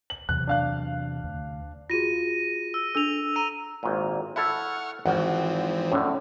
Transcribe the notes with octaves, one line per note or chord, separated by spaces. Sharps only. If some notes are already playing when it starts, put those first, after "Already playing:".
F#7
E2 C3 F#3 F#6
D4 F5 F#6
D2
F4 F#4 G#4 A#6 D#7
E6
D4 A4 E6 F7
A#5 E6 D#7
G#1 A#2
E4 A4 E5 F#5 C#6 F6
G#1 E3 F3 C4 F#5
A2 D3 C#4